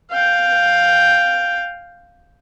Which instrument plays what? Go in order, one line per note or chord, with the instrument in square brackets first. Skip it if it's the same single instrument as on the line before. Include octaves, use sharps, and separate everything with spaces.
[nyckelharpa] F5 G5